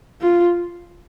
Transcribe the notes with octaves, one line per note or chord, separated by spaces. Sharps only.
F4